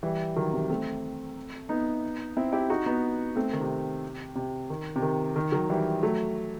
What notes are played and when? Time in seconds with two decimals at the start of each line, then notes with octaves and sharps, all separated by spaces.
0.03 E3 G3
0.36 D#3 F#3
0.53 C3 E3
0.70 A3 C4
1.69 B3 D#4
2.37 C4 E4
2.52 E4 G4
2.70 D#4 F#4
2.86 B3 D#4
3.36 A3 C4
3.53 D#3
3.61 C3
4.36 C3
4.70 D#3
4.96 C3
5.02 D#3
5.36 D#3
5.52 D#3 F#3
5.69 E3 G3
6.03 F#3 A3